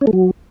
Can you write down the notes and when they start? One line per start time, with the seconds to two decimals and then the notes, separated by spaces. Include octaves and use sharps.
0.01 C#4
0.07 A3
0.13 F#3